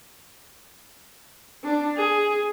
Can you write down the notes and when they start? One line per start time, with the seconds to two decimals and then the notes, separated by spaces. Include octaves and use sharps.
1.64 D4
1.96 G#4